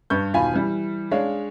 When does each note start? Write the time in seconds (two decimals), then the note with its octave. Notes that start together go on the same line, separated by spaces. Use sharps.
0.10 G2 B4 C#6 G6
0.34 E1 D#3 F4 F5 G#5 B5
0.54 E3 G3
1.11 G#3 D4 C#5 F5